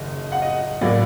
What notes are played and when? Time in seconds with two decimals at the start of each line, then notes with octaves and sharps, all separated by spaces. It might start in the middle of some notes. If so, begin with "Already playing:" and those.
Already playing: F#1 F#2 D#3 D#5
0.32 F#5
0.42 D#5
0.81 A2 F#3 A#3 D5